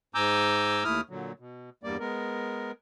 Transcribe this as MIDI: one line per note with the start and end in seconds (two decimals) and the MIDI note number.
0.15 0.84 44
0.15 0.84 80
0.15 0.84 82
0.15 0.84 86
0.15 0.84 88
0.15 0.84 91
0.84 1.01 39
0.84 1.01 57
0.84 1.01 64
0.84 1.01 87
0.84 1.01 89
1.10 1.32 46
1.10 1.32 50
1.10 1.32 54
1.39 1.70 47
1.83 1.97 40
1.83 1.97 43
1.83 1.97 55
1.83 1.97 58
1.83 1.97 74
2.00 2.72 56
2.00 2.72 59
2.00 2.72 70